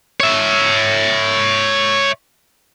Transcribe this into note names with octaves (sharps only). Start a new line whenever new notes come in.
C#5 E5